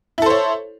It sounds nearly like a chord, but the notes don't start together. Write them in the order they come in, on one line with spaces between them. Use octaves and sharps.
E4 A4 C5 C#5